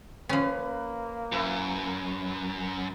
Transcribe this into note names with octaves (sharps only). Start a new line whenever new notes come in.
F3 A#3 C#4 B4
F#2 E4 B4